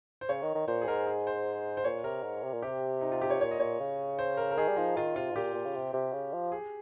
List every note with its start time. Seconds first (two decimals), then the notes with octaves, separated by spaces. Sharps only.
0.21 C5
0.29 C#3 C#5
0.42 D#3
0.55 D#3
0.68 A#2 C5
0.82 G#4
0.87 G#2 A#4
1.06 G#4
1.27 C5
1.77 C5
1.84 A#2 C#5
2.04 C3 A#4
2.24 G#2
2.44 C3
2.54 A#2
2.62 C3 G4
3.01 D#4
3.12 F4
3.22 G4
3.30 C#5
3.40 A#2 C#5
3.51 D#5
3.59 A#2 C#5
3.80 C#3
4.19 C5
4.37 A#4
4.51 A#4
4.57 D#3 G#4
4.69 G3
4.76 F3 D#4
4.97 D#3 F4
5.16 C3 F4
5.31 G#2
5.35 A#2 G4
5.54 A#2
5.66 C#3
5.75 C3
5.93 C3
6.13 C#3
6.33 F3
6.52 G#4